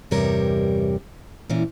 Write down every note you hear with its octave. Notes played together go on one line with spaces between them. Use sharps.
E2 G2 C3 G3 A#4 C#5
A#2 E3 C#4